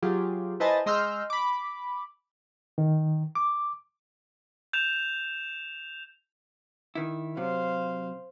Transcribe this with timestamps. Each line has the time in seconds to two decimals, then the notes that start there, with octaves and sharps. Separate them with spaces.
0.02 F#3 F4 G4 G#4
0.60 E4 B4 C5 D#5 G#5 A5
0.86 G#3 D#5 C6 E6 F6 G6
1.30 B5 D6
2.78 D#3
3.35 D6
4.73 G6 E7 F7
6.95 D#3 E4
7.37 C3 F#3 C5 F5